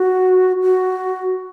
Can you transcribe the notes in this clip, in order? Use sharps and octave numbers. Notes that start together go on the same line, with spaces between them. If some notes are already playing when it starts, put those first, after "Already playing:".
Already playing: F#4
F#4